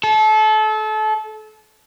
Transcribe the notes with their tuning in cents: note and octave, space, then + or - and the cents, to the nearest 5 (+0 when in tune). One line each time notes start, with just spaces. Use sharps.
A4 -30